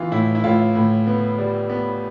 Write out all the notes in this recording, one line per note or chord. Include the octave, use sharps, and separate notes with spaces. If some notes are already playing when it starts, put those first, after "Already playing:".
Already playing: E3 B3 F4
A2 E4
E4
A2 F4
A2
B3
G3
B3